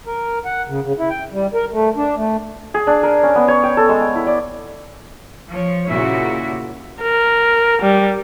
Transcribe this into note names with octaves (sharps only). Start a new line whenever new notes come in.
A#4
F#5
C#3
C#3
E4
G5
G3
A#4
A3
D4
A3
G#4
D4
A#4
C#4
B3
C#5
G5
A4
G#3
G5
E4
D5
F3 C#5
A#2 C#3 E4 F#4 G4
A#4
G3